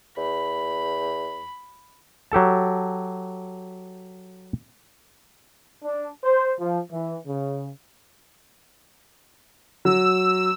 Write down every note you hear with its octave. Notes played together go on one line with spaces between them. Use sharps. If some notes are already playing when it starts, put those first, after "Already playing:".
E2 B5
F#3 G4 A4 A5
D4
C5
F3
E3
C#3
F#3 E6